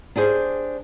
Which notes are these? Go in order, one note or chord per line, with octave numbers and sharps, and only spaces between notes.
D4 G4 G#4 C5